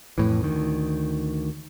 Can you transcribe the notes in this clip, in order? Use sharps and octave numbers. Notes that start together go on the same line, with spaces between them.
F2 A2 E3
D2 D#3